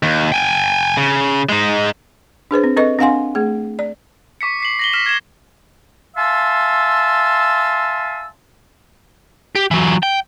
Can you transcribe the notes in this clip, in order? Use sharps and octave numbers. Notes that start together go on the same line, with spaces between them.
D#2
G5 G#5
C#3
G#3 D#4
D4 G#4 B4 C5
C4
C4 A4 B4 D#5 C#6
C4 D4 F5 F#5 G#5 C6
A3 G#4
D5
C#6 D6 B6 C#7
B6 C7 F#7
A#6 F#7 G7
F6 B6 E7
G#6 E7
E5 F5 G#5 A5 C6 E6
G4
E3 F#3
G5